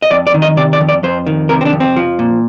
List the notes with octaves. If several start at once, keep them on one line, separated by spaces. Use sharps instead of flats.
D#5
F2 D5
D5
D#3
D#5
C3 D5
D5
F2
D5
F2 C5
D#3
C3 A#4
C4
D4
F2
C4
F3
A#2